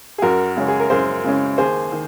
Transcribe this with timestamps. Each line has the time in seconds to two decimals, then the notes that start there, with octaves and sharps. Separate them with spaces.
0.18 G#4
0.22 F#2 F#4 A#4
0.56 C#3 G#3 C#4
0.68 G#4
0.80 A#4
0.90 F#2 G#4 C5
1.24 C#3 G#3 C#4
1.58 D#2 G#4 C5
1.92 D#3